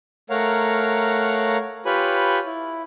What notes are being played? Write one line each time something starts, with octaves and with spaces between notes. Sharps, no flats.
A3 A#4 C#5 F5 F#5 A#5
F4 G4 B4 C#5 G#5 B5
E4